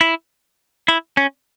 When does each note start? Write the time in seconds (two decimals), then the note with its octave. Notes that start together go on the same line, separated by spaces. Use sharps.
0.01 E4
0.88 E4
1.17 C#4